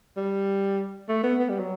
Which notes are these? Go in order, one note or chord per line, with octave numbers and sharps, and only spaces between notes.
G3
A3
B3
B3
G3
F#3